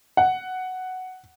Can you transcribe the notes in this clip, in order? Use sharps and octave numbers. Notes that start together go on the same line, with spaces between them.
F#5